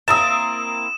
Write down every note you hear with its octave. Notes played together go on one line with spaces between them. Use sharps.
A#3 C4 E4 D#6 E6 A6 E7